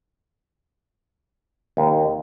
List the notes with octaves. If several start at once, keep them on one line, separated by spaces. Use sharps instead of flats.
D#2